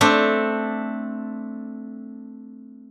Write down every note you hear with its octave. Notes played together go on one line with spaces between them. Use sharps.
A3 C4 D4